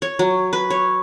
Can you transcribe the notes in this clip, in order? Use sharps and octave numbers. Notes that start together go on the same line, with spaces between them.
C#5
F#3
B4
C#5